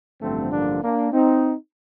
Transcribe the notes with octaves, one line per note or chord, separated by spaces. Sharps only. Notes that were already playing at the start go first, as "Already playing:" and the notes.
A1 G2 D3 F3 A3 C4
A#3 D4
A#3 D4
C4 D#4